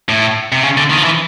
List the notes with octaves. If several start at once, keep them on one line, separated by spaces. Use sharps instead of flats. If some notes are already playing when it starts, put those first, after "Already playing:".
A2
C3
C#3
D3
D#3
F3
E3